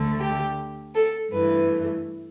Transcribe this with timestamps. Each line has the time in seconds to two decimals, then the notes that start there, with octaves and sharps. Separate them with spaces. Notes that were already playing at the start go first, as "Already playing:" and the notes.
Already playing: D2 D3 A3
0.20 G4
0.95 A4
1.32 G2 E3 A3 B4